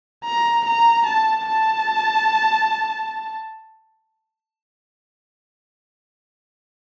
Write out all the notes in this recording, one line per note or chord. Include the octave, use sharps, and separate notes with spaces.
A#5
A#5
A5
A5